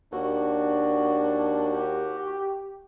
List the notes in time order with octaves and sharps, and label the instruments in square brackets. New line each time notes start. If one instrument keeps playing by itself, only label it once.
[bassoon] D#2 [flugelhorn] D4 [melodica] F#4
[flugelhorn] G4